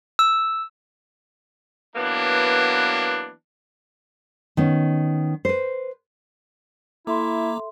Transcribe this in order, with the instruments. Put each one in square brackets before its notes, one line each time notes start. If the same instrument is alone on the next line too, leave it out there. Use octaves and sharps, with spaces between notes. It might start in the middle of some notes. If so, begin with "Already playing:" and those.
[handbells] E6
[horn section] E3 F#3 A#3 B3 D4
[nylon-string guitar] D#3 B3 C#4
B4 C5
[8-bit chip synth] A#3 A#5 D6 [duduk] E4 [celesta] A4 E5 C6